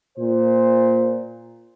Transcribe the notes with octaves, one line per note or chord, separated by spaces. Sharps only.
A#2 C5